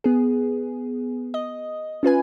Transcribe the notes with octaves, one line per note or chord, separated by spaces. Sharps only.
B3 G#4
D#5
C#4 F4 B4 G#5